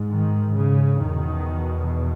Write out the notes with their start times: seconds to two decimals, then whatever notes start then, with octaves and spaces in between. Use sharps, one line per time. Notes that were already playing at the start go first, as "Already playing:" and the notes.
Already playing: G#2
0.11 D#3
0.56 C#3
1.01 E2 B2 D#3